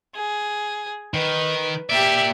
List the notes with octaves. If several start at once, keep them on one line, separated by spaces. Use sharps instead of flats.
G#4
D#3 B4
A#3 G4 D5 E5